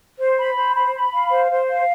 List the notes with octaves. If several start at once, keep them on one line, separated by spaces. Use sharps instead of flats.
C5
B5
C5
B5
B5
F5
C5
C5
F5